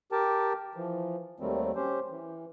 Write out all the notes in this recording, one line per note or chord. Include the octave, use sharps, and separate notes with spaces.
G4 A#4 G5 A5
E3 F3
D#2 D#3 F#3 G3 A3 C4
C#4 G4 C5
E3